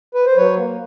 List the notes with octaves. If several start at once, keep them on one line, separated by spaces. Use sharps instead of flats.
B4
C5
F#3 B4 C#5
A#3